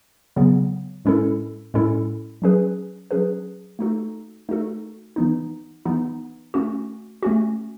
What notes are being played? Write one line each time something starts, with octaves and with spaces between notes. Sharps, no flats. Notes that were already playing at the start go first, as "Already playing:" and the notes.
C#3 F#3 B3
A2 G#3 C#4 E4 A4
A2 G#3 C#4 E4 A4
F#3 C#4 G#4 B4
F#3 C#4 G#4 B4
A3 D#4 F#4 A4
A3 D#4 F#4 A4
E3 B3 D#4
E3 B3 D#4
A3 C#4 F#4
A3 C#4 F#4